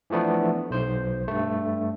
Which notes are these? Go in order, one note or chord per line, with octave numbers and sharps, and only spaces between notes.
E3 F3 A3 B3 D4
B1 C5
G2 A3